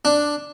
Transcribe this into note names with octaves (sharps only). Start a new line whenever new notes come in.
D4